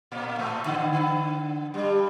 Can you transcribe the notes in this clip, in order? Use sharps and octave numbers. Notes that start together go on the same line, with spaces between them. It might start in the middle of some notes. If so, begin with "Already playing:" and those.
A#2 A#3
A2 A3
D3
D3
G2 G3